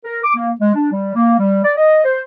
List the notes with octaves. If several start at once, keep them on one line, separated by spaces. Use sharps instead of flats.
A#4
D6
A#3
G#3
D4
G3
A#3
G3
D5
D#5
C5